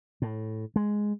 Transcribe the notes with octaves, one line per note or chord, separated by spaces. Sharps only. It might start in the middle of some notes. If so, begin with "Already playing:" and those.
A2
G#3